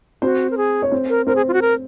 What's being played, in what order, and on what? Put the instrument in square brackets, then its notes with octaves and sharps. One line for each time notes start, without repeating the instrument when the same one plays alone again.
[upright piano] C4 C5 [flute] F#4
[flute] A#4
G#4
[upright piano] C#5
C4 C5
[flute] A#4
[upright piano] C4 C5 [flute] A#4
[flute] G#4
F4
F#4
A#4